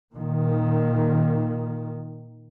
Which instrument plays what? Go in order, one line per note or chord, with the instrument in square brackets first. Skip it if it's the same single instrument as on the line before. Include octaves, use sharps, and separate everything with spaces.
[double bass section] A#2 D#3